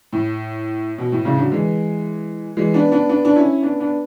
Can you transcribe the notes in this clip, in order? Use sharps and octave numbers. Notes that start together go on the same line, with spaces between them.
A2
B2
A2
A2 C#3
D3 F#3
E3 G#3
E3 G#3
B3 D4
B3 D4
B3 D4
D4
C#4 E4
B3 D4
B3 D4